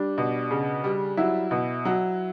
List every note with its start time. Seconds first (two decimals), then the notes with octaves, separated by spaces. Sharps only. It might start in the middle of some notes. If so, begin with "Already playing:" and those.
Already playing: G3 D4
0.18 B2
0.51 C#3
0.84 G3
1.17 F#3 E4
1.51 B2
1.85 F#3